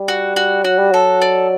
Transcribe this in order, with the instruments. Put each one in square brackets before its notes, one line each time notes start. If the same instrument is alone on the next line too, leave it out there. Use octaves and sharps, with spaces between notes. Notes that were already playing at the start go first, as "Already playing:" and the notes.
Already playing: [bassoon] G3
[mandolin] F#4
F#4
[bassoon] F#3 [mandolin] F#4
[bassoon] G3
[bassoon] F#3 [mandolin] A4
[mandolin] D5